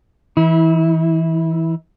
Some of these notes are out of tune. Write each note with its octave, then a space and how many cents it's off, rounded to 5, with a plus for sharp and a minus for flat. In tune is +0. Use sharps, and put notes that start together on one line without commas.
E3 -10 E4 -30